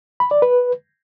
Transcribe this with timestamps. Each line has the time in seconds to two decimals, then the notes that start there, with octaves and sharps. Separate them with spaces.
0.20 B5
0.31 D5
0.42 B4